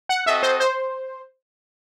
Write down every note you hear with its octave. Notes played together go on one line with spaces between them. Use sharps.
F#5
C4 F#4 A4 D#5 E5
C5
C5